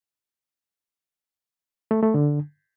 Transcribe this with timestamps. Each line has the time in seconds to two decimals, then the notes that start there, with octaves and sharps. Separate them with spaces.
1.91 A3
2.03 A3
2.14 D3